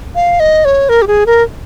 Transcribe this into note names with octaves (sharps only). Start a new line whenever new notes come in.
F5
D#5
C#5
A#4
G4
G#4
A#4